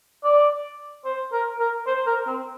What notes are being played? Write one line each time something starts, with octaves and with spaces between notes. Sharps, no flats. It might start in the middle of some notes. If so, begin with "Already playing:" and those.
D5
C5
A#4
A#4
C5
A#4
C4